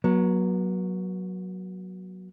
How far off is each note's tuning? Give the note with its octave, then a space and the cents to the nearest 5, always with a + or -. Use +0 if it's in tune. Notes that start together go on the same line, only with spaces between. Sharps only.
F#3 +0 B3 -40